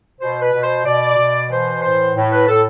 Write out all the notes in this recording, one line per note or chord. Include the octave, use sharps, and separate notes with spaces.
B2 C5
B4
B2
C5
B2 D5
B2
E3 C5
A2 C5
A2
B4
A2 A4